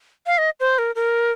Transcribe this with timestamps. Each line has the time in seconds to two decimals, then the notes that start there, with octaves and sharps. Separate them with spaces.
0.27 F5
0.38 D#5
0.60 C5
0.78 A#4
0.96 A#4